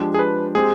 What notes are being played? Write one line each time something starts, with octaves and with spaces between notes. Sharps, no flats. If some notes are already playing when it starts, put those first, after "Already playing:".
Already playing: F3 G#3 D4 G4
G#4
B4
G#3 C4 G4 G#4